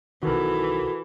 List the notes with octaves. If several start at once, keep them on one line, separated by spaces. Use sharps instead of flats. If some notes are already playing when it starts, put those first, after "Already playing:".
B1 D#3 E3 F#4 A4 A#4